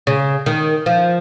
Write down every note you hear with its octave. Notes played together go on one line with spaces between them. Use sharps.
C#3
D#3
F3